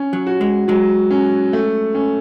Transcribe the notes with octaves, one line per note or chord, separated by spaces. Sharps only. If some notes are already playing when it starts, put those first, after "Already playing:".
Already playing: C#4
F#3
F#4
G#3
F#3 G#3
C#4
A3
C#4